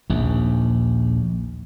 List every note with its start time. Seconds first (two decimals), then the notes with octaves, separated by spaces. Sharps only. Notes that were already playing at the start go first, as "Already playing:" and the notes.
0.10 A#1 D#2